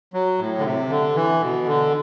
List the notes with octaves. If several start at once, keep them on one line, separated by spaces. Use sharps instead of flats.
F#3
A2
D3
C3
D3
E3
B2
D3